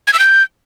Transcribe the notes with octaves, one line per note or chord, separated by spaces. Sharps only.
G#6
E6
G6